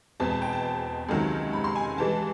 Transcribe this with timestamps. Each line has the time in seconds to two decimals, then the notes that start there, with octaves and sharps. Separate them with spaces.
0.20 E2 B2 G#3 C4 A5
0.31 A5
0.42 G5
0.53 A5
1.08 C#2 C3 D#3 F#3
1.53 B5
1.64 C6
1.76 G#5
1.98 G2 E3 G#3 A5